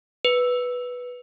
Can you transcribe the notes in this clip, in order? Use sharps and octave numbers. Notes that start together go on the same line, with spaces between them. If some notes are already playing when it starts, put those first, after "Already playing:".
B4